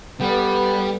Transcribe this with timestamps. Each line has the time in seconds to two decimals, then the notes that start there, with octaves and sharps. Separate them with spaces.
0.21 G3 B3 A4 B4 D5